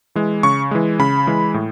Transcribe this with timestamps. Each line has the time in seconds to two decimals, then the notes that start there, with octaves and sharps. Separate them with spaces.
0.15 E3 G#3
0.43 C#3 C#6
0.71 E3 G#3
0.99 C#3 B5
1.27 E3 G#3
1.54 A2